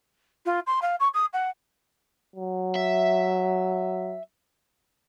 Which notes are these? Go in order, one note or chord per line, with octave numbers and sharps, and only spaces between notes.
F4
C6
F5
C#6
D#6
F#5
F#3
E5